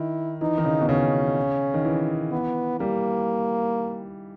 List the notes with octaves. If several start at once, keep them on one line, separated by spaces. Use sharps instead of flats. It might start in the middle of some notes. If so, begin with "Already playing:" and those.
Already playing: D#3 E4
E3 D#4
D#3
C#3
B2
C#3 C#4
D#3
E3
B3
G3 A#3